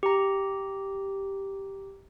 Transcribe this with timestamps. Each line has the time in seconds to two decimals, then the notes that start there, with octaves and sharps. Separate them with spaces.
0.03 G4 A#5